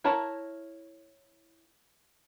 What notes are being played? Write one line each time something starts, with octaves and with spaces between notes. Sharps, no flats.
E4 A#4 C#5 A5